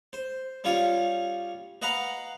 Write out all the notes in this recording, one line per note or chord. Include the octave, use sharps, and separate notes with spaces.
C5
G3 C#4 F4 D#6
B4 D#5 F5 F#5 A#5